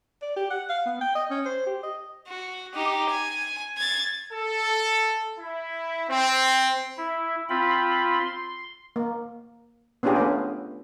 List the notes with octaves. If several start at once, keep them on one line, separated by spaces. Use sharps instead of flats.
D5
G4
F#5
F5
B3
G5
D#5
C#4
C5
G4
D#5
F#4
D#4 G4
G#5
G#6 A6
A4
E4
C4
E4
C4 F4 B5
C6
A#3
B3 C#4 D4 F4 G4 G#4
A3 B3 C#4